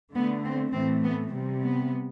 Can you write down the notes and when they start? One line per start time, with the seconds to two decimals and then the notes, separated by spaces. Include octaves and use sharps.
0.15 D3 A3 B3
0.45 C4
0.73 A2 E3 A3 C4
1.03 B3
1.32 C3 G3 A3
1.61 B3